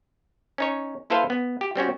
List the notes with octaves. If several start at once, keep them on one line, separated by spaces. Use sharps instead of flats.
C#4 D#4 C#5
A#3 E4 A4 B4 C5 F5
B3
G4
G3 C4 C#4 F#4